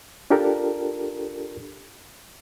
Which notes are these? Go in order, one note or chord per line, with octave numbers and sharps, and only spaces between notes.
D4 F4 G4 A4 A#4